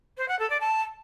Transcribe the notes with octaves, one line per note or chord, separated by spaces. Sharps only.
C5
F#5
A4
D5
A5